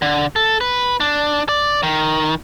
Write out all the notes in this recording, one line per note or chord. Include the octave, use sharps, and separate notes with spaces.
D3
A4
B4
D4
D5
D#3